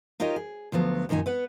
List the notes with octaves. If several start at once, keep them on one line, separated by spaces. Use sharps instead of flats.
D#4 F4 G4 A#4 C#5 D#5
G#4
D2 F3 F#3 B3
F#2 A#2 D#3 D#4 G#5
B3 B4 F#5